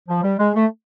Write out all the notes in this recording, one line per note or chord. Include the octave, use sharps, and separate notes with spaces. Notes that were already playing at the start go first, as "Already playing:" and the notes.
F3
G3
G#3
A3